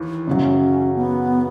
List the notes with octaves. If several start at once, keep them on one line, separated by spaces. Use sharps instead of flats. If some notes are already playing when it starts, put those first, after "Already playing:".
Already playing: D#2 E3
F#2 C#3 F#3 C#4
B3